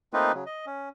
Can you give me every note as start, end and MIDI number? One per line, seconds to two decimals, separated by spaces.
0.13 0.32 57
0.13 0.32 58
0.13 0.32 60
0.13 0.32 63
0.13 0.32 65
0.13 0.32 71
0.34 0.44 49
0.34 0.44 54
0.46 0.65 75
0.66 0.89 61